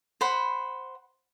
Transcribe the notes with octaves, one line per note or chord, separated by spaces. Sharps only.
C5 F#5 B5